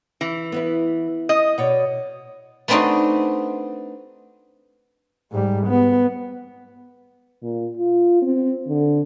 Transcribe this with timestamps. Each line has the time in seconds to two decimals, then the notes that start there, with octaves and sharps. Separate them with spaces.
0.21 E3
0.52 B3 E4 B4
1.29 D#5
1.58 B2 C#5 D5
2.68 A3 B3 C4 D4 D#4 F#4
5.32 G#2 G3
5.67 B3
7.42 A#2
7.77 F4
8.22 C4
8.69 D3